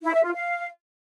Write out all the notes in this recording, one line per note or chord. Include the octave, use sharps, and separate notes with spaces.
E4
E5
F4
F5